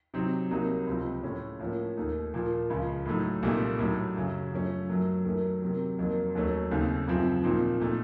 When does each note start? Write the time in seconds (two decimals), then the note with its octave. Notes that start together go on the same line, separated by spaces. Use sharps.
0.14 C3 F#3 C4 D#4
0.51 C2 C3 F#3 A#3 D#4
0.87 C#2 C3 F3 C4
1.23 A2 A3 C#4
1.60 A2 F3 A#3 C#4
1.97 D#2 D#3 A3 D#4
2.34 A#2 F3 A#3
2.70 C#2 C#3 F3
3.06 A2 F#3 A3 D#4
3.43 C2 A#2 A3 D#4
3.79 A2 F#3 A3 D#4
4.16 F#2 C#3 F#3
4.52 F#2 F3 A3 C#4
4.89 F#2 D#3 F#3 A3
5.25 F#2 D#3 F#3 A3
5.62 C3 D#3 F#3
5.99 F2 D#3 F#3 A#3
6.35 D#2 D#3 F#3 A3 C#4
6.71 D#2 C#3 A3 C4 D#4
7.08 F#2 C#3 F3 C4
7.44 A#2 F3 C4 D#4
7.80 A#2 A3 D#4